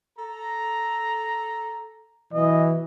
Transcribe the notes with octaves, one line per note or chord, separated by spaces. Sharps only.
A4 A#5
B2 E3 F#3 D#5